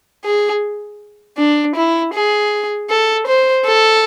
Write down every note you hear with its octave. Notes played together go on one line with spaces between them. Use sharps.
G#4
D4
E4
G#4
A4
C5
A4